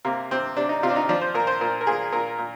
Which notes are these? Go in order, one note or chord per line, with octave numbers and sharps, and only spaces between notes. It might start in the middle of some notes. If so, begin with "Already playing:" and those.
C3 A#3
C3 C4
C3 D4
D#4
C3 F4
D4
D#4
F3 D4
C5
A#2 A#4
C5
A#2 A#4
A#4
A#2 G#4
A#2 A#4
A#2